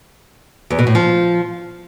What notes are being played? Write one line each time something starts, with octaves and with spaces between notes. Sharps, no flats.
E2
B2
A2
F3